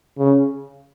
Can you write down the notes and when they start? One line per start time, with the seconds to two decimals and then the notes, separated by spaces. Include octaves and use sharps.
0.18 C#3